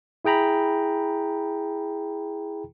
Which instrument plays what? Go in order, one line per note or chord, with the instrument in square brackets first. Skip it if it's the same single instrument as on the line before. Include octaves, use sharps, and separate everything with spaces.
[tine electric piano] E4 G#4 G5 A#5 B5